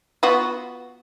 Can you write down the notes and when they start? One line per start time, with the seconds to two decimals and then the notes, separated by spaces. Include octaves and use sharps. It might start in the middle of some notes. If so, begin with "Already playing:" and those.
0.23 B3 F4 F#4